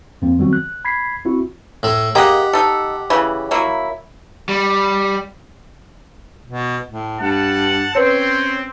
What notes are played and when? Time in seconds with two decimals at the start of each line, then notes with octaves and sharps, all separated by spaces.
0.22 F2 F3 A#3 C4
0.39 D#3 F#3 G3 B3 C4 F#4
0.53 F#6
0.85 B5 G#6 B6 C7
1.25 C4 E4 F#4
1.83 A2 A4
2.15 A#3 G4 G#4 D#5 F#5
2.53 D#4 A4
3.10 C#3 E3
3.51 F#3 A#3 E4
4.49 G3
6.46 B2
6.88 A2
7.21 G2 F#5 A5
7.95 C4 C#4 B4 C#5